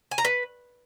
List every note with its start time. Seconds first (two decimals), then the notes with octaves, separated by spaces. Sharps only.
0.11 G#5
0.18 A#5
0.25 B4